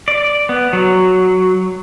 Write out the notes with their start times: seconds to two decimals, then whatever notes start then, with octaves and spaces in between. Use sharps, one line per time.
0.08 D5
0.49 B3
0.73 F#3